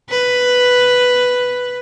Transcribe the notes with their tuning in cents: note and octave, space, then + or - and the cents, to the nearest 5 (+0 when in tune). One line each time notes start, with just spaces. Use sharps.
B4 +0